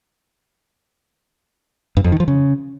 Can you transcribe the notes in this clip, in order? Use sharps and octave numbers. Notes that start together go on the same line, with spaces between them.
G2
F2
D#3
F3
C#3